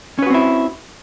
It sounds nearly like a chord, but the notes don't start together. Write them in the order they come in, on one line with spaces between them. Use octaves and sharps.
C#4 B4 F#4 C4 E4